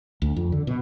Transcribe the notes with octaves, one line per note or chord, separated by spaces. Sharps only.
D2
F2
D3
B2